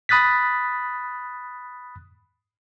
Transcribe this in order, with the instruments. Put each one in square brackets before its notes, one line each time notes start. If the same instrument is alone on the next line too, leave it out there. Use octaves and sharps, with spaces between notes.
[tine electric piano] B5 D#6 F#6 A6 B6